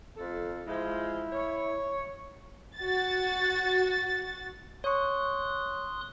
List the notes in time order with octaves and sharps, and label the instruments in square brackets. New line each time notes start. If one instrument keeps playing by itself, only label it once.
[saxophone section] F2 A4
[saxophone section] F3 G#3 [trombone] E4
[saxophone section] C#5
[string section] F#4 A6
[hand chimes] C#5 C#6 [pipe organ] C6 D#6 F#6